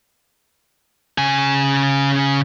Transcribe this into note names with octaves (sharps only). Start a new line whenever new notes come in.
C#3 G#5